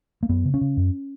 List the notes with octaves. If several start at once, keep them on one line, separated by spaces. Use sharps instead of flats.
A#3
F#2 B3
C#3
C#4
C#3
F#2